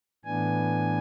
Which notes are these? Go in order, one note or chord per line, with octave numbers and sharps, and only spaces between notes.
A2 E3 B3 D4 G#5